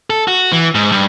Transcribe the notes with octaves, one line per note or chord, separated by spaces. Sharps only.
A4
F#4
E3
G#2
G2